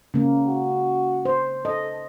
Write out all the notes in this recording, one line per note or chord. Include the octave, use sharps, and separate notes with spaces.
C#3 A#3
F#4
C5
A4 D#5